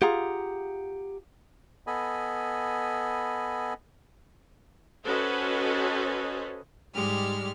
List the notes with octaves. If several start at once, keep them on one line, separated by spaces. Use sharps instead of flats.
F4 G4 G#4 F#5 A#5
B3 A4 D#5 G#5 B5
C#4 F#4 A4 B4 C5 D#5
G#2 G3 G#3 G4 F6